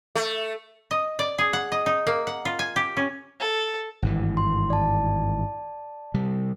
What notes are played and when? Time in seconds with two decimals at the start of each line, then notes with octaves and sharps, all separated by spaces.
0.15 A3
0.91 D#5
1.19 D5
1.38 G#4
1.53 F#5
1.72 D#5
1.86 D#4
2.07 A#3
2.27 F#5
2.45 F4
2.59 G#5
2.76 G4
2.97 C#4
3.40 A4
4.02 G#1 G2 E3
4.37 C6
4.70 D5 A5
6.14 C3 G3